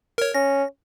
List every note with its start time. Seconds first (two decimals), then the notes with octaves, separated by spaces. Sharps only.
0.18 A#4 C#5
0.34 C#4 A#6